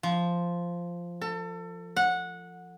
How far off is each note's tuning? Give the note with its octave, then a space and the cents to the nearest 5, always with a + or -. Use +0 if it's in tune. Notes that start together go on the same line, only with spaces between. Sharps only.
F3 -5
A4 +30
F#5 -15